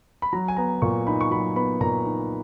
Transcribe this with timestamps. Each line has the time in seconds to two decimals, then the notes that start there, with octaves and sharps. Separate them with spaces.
0.22 B5
0.33 F#3 A#5
0.48 G#5
0.57 B3 A#5
0.82 A#2 C#6
1.07 D#4 B5
1.21 C#6
1.31 F#3 B5
1.56 B3 B5
1.81 A#2 A#5
2.05 D#4